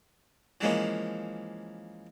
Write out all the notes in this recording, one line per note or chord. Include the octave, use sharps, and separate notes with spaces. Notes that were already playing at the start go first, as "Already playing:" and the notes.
E3 F3 G#3 A#3 C#4